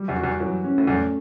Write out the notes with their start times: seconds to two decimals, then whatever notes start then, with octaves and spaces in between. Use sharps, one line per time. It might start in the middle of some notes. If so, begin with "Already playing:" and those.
Already playing: G3
0.08 E2 G2
0.16 F#4
0.24 E2
0.40 F#2 E3
0.64 C#4
0.78 A2
0.87 E2 G2 A3